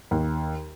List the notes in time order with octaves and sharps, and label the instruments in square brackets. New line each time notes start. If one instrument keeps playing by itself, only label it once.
[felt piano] D#2